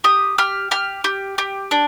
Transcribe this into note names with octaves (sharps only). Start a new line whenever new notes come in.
G4 D#6
G4 F6
G4 F6
G4
G4
D4